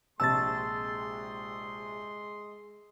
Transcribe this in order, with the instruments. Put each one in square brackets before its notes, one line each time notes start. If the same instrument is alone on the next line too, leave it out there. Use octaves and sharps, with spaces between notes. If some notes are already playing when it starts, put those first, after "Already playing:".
[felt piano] A#1 C3 A5 [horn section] G#3 D#5 C6 [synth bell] E6 A6